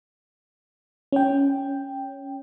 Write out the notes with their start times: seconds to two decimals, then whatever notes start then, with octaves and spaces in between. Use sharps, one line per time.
1.13 C#4 G5